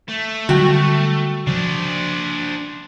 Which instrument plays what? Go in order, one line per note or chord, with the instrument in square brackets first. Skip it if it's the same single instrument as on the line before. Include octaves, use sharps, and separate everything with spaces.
[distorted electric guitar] A3
[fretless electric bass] D3 F#3 G3 [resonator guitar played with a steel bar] F#4 G5
[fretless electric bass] C#3 F3 [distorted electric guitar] D4 C5